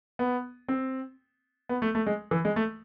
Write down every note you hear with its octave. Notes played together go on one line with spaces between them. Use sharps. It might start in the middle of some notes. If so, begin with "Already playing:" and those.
B3
C4
B3
A3
A3
G#3
E3
G#3
A3